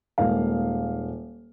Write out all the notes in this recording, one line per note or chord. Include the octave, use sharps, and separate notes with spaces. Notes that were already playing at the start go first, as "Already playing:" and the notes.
D#1 G#3 A#3 F5